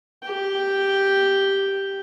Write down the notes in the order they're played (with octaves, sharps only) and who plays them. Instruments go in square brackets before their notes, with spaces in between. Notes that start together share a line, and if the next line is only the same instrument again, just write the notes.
[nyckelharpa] G4 G5